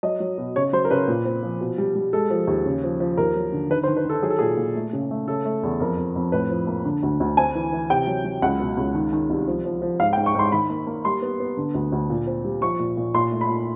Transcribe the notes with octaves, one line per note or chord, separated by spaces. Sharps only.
F#3 D#5
F#3
B2
C#3 C#5
F#3 C5
A#4
C#3 B4
A#2
C4
F3
B2
G3
G3
G#3 A4
F3
D#2
C#3
F3
F3
D#2 A#4
F#3
D3
D#3 B4
C5
D#3
B4
D#3 A4
F#3 G#4
A4
A#2 G#4
A#2
A3
C#3
A3
C#3 A4
A3
E2
F2 A#4
F2
F2
A2 B4
F3
A#3
D3
D2
D2
C4 G#5
E3
E3
C3 G5
F#3
F#3
C#2 F#5
B2
C#2
D#3
D#3
C2
F3
F3
F3
G#2 F5
G5
G#2
C#6
G#2 C6
D#3 B5
A#3
A#3
G3 C6
B3
B3
D3
D2
D2
A#2
C4
G3
F3 C#6
A#2
A#2
A#2 C6
A3
B5
A#2